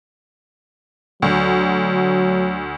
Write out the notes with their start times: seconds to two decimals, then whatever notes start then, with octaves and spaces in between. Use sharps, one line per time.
1.22 D2 F#3